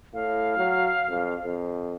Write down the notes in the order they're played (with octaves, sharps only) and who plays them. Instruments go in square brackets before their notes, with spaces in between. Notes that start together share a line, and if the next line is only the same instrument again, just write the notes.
[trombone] A2 [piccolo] F5
[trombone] F#3
F2
F2